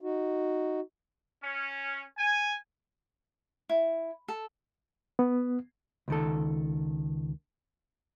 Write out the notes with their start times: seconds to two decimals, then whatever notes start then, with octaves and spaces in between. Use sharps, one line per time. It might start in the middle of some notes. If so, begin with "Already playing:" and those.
0.01 D#4 F#4
1.43 C#4
2.18 G#5
3.69 E4
4.28 A4
5.19 B3
6.08 C#2 D#3 A4